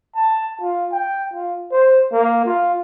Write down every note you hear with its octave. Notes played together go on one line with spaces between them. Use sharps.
A5
F4
G5
F4
C5
A#3
F4